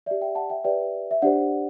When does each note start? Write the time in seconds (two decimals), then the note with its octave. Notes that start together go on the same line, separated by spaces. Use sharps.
0.06 G4 D5 E5
0.21 E5 G5
0.35 F#5 A5
0.50 E5 G5
0.64 G4 B4 D5 E5 G5
1.11 E5
1.22 D4 G4 C5 D5 F#5